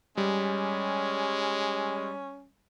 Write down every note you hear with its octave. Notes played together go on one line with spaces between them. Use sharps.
G3 G#3 C#4